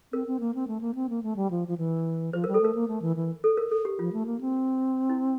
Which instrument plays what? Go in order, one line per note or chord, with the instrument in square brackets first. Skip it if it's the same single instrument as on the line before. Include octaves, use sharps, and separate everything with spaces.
[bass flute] C4 [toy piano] A#4
[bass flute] C4
A#3
C4
A3
A#3
C4
A#3
A3
G3
F3
F3
E3
[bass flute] F3 [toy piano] C5
[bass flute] G3 [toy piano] A#4
[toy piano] A4
[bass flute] A3 [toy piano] A#4
[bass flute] A#3
A3
E3
E3
[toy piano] A4
A#4
A4
G4
[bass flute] F3 [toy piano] F4
[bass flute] A3
A#3
C4
[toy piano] E4